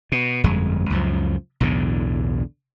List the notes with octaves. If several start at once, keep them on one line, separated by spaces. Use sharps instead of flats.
B2
G1 F2 G#3
C#2 F#2 F3
B1 E2 A2 D3